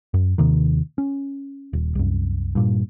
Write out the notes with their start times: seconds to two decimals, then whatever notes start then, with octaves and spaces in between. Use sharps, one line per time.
0.14 F#2
0.38 D#2 C3 D#3
0.98 C#4
1.73 D#1
1.95 C2 F#2
2.55 G2 A#2